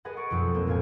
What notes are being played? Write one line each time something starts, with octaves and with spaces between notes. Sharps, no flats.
G#4 A#4 B4 D#5 F#5 A5
C#6 A6 D7
B1 F2
G#3 A#3 C4 F4
A#1 A2 C5 F5 G#5